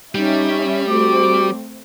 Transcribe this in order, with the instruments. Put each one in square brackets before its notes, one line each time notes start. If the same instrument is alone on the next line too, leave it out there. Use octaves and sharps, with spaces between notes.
[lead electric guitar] G3 [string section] C#4 E5 [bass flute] D#4
[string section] A3 C4 [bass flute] F#4 [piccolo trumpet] D6